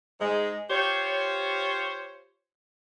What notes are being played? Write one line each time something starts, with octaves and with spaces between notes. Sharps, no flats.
G#2 G#3
F4 G4 C5 C#5